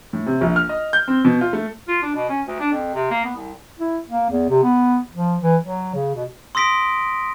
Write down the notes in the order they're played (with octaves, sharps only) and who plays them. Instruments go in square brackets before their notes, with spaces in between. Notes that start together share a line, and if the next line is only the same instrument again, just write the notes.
[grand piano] A2
C3
A#1
F6
D#5
G6
C4
B2
F4
A3
[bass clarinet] F4
D4
B2
C#4
D2
D4
F2
C3
A#3
B3
C2
E4
A#3
E2
C3
B3
F3
E3
F#3
C#3
B2
[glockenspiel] C6 D#6 E6 A#6 B6 D7